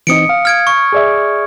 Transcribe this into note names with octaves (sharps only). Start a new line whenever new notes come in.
E3 C4 D#4 D#6 C#7 D7
F5
F6 G#6 D7
C#6
G#4 D5 E5